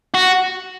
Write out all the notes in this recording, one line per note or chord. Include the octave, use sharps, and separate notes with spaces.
F#4